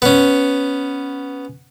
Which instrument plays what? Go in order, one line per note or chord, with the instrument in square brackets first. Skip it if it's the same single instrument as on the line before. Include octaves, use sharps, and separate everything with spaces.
[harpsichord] B3 C#4